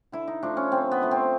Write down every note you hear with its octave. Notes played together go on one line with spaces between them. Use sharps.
D3 E4
D#4
F3 A3 D4
C#4
D3 C4
B3
F3 A3
C4